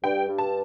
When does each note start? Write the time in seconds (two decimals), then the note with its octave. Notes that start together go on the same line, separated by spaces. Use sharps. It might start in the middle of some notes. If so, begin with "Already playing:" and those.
0.03 G2 G5
0.28 G2
0.38 A5